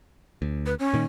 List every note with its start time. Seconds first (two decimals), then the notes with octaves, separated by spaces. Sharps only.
0.42 D2
0.66 B4
0.79 C#4
0.94 A#2 D#3